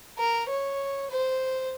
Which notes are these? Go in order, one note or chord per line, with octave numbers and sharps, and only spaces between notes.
A#4
C#5
C5